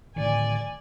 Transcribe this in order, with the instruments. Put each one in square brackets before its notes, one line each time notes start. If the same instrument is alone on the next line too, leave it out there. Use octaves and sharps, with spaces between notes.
[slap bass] A2 D3 D#3 [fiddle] D5 G#5